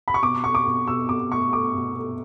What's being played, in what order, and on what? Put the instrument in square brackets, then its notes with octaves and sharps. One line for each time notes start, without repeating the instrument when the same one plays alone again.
[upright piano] B5
C#6
B2 D6
B2 C#6
D6
B2
B2 E6
B2 D6
A3 C#6
A3 D6
B2
A3